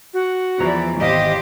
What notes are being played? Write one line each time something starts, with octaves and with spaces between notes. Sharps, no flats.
F#4
E2 E3 F3 D5 A#5
G#1 E2 G4 C5 D#5 F5